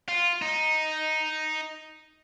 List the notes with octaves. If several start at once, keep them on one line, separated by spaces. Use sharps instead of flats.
F4
D#4